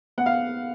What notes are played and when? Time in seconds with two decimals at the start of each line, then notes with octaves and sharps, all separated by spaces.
0.18 B3 F#5
0.26 F5